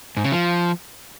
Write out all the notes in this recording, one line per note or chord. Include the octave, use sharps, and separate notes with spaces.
G#2
C#3
F3